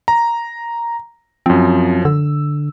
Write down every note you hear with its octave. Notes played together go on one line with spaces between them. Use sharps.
A#5
F#2 F3 C4
D3 E6